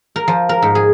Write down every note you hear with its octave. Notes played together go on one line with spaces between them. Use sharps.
A#4
F3
A#4
G#2
G#4